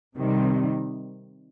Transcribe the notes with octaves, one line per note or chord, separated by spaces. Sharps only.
C3 D#3 G3